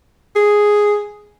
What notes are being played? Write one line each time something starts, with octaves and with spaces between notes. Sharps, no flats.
G#4